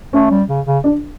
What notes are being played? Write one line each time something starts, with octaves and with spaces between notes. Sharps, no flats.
A3 C#4
G3
C#3
C#3
D4